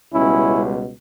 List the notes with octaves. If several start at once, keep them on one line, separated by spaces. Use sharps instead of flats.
C#2 B2 G3 C#4 E4